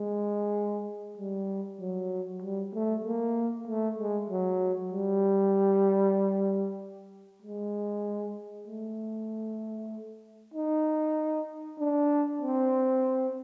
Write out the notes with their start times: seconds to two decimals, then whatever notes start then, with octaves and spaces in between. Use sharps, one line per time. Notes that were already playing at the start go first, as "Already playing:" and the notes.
Already playing: G#3
1.18 G3
1.80 F#3
2.42 G3
2.74 A3
3.05 A#3
3.68 A3
3.99 G#3
4.30 F#3
4.92 G3
7.42 G#3
8.67 A3
10.54 D#4
11.79 D4
12.42 C4